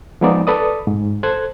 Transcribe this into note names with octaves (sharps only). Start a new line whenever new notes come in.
F3 G#3 B3 D#4 D5
A4 B4 D5 D#6
G#2
A4 C5 F#6 G#6